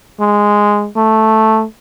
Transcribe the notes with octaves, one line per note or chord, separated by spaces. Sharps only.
G#3
A3